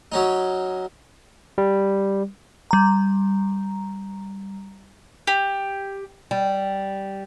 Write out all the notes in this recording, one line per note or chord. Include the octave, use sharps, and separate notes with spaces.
F#3 C#4 D#4
G3
G3 A#5
G4
G3